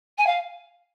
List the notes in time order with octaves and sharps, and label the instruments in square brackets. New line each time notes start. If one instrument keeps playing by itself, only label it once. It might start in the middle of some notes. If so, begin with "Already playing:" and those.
[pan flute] G#5
F5